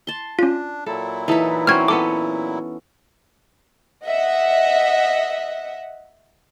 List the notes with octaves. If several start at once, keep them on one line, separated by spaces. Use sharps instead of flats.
A5 C6
C#4 D4 F4
A#2 F#3 E4 A4
E3 D#4 A4 B4
C4 C#4 F#4 F6 G#6
B3 C#4 A4 D6
D#5 E5 F#5